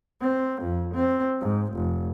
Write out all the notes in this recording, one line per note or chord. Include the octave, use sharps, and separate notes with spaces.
C4
F2
C4
G#2
F1